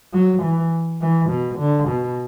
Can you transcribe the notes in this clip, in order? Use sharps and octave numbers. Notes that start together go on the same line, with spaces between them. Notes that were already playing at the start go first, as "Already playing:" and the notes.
F#3
E3
E3
B2
D3
B2